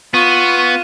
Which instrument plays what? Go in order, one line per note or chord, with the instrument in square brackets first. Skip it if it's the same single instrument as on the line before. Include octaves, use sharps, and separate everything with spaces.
[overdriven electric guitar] B3 [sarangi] F4 [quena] C#6 [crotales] D#7